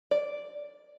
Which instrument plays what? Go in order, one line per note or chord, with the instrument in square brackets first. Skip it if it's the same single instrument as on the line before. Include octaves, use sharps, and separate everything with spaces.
[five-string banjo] D5